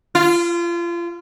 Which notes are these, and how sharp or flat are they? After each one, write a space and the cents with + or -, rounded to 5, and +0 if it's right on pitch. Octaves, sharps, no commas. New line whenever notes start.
F4 -30